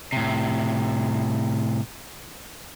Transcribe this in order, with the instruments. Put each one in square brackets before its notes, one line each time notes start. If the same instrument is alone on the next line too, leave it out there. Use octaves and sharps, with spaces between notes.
[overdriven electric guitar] A2 C3